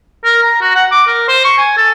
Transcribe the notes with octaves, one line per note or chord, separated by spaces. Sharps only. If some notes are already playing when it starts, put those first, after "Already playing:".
A#4
A#5
F#4
F#5
D6
A#4
C5
C#6
G#5
A4